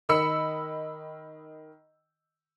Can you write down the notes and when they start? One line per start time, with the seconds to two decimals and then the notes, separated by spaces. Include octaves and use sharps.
0.09 D#3 D#5 B5 E6 C#7